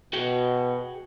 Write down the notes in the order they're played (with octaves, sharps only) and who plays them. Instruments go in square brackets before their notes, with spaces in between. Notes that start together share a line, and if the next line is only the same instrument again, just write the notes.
[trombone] B2 [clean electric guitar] F#4 G#4 G5